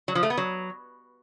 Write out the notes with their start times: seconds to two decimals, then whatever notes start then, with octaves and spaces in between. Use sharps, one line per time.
0.08 F#3
0.15 F3
0.23 A3
0.30 B3
0.37 F#3